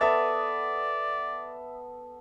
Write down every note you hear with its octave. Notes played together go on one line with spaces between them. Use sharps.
B3 A4 D5 E5 D#6 A6